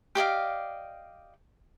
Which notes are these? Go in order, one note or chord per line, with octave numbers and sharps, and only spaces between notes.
G4 D5 D#5 F5